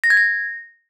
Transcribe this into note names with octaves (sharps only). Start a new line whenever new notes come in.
A#6
G#6
A#6